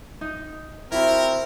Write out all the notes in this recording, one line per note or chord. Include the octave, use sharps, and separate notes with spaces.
D#4
C4 E4 F#4 A#4 B5